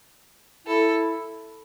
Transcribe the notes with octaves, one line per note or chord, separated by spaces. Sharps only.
E4 A4